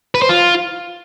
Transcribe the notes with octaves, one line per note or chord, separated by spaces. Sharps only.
B4
C5
F4